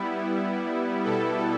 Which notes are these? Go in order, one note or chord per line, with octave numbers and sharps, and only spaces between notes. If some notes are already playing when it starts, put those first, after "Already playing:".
Already playing: G3 B3 E4
B2 G3 B3 E4 A4